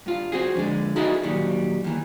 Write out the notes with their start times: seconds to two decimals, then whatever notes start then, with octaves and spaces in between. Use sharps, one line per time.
0.06 G2 F4
0.32 C4 F#4 G#4
0.55 F2 D3 G#3
0.96 D#4 E4 F#4 G#4 A4 D#5
1.23 A#2 D#3 F#3 G3
1.84 D#2 E3